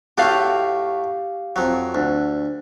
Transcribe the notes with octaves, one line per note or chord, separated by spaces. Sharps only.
A2 A3 F#4 G4 F5
F2 F#3
D2